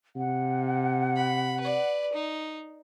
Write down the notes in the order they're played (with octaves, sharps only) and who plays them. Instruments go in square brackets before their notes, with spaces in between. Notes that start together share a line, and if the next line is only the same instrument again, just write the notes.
[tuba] C3 [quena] F#5
[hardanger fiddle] B5
B4 D5
D#4